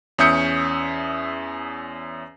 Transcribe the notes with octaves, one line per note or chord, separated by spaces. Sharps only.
E2 C#4 E5 D#6 G6 C#7